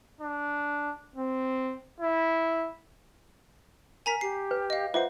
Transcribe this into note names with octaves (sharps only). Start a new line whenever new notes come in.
D4
C4
E4
A#4 G#5 A#5 B6
G4 C7
B4
D#5 F5
F4 B4 C5 E5 F#5